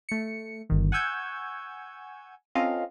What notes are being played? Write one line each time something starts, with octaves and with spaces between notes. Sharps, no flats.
A3 C#7
G1 D#3
F#5 G#5 C#6 E6 G6 G#6
C4 C#4 F4 A4 D#5 F5